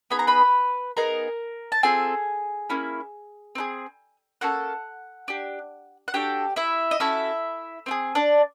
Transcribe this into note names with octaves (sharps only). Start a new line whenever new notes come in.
B3 D#4 G#4 B5
A#5
B4 B5
B3 D#4 G#4 A#4 A#5
A5
C4 F4 G#4 A4 G#5
A#3 C#4 E4
C4 D#4 G#4
A#3 C#4 F#4 A4 F#5
D4 G4
F#5
D4 F#4 G4 A4 G5
E4 E5
D#5
C#4 E4 F#4 A4 E5
C4 F4 G#4
D4 D5